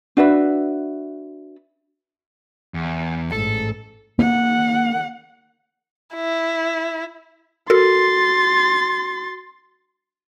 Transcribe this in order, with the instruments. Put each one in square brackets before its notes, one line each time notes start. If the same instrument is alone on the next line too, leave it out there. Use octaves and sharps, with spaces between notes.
[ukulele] D4 F#4 B4 E5
[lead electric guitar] E2
[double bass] A1 G#2 [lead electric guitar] A4
[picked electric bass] A#3 [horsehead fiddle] F#5
[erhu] E4
[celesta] F#4 [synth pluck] A4 A#4 [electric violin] C6 A6